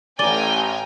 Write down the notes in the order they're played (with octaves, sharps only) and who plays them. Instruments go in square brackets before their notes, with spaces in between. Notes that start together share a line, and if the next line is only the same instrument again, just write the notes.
[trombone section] A1 [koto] D5 [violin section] G5 G#5 A#5 [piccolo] G7